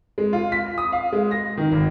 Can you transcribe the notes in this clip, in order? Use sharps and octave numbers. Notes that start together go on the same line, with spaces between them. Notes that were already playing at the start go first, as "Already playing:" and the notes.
G#3
F4
B6
D#6
F5
G#3
A#6
D#3
G#1